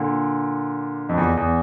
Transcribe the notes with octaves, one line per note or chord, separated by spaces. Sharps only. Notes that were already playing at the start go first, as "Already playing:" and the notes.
Already playing: A#2 D3
F2
E2
E2